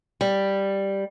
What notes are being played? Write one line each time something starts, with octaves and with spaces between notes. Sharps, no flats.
G3